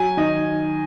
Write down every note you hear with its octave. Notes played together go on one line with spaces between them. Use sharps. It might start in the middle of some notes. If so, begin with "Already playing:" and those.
Already playing: F#3 G#5
D#3 D#5